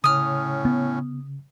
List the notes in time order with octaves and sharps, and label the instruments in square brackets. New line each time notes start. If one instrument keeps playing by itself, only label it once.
[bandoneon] A2 C#4 [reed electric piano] C#3 [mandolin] D#6 F6
[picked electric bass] B3